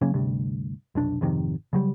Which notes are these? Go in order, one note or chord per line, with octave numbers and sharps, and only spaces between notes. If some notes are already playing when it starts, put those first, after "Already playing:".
C#3 F#3 A#3 C#4
D2 G2 C3
F1 B1 D4
G#1 F2 C3 D#3
C#3 F#3 G3